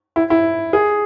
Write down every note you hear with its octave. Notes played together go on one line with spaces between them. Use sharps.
E4
E4
G#4